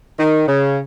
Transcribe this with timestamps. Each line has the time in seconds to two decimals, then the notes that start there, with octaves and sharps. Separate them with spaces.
0.19 D#3
0.48 C#3